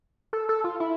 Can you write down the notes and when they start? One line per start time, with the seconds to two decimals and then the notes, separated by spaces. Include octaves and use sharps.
0.33 A4
0.49 A4
0.64 F4
0.80 E4